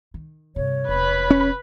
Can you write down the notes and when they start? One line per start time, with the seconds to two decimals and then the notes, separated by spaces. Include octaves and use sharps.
0.14 D#3
0.56 G2 C3 C#5
0.88 E1 C3 B4 B5
1.30 C#4